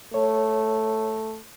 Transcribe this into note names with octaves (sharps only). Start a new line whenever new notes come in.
A3 C#5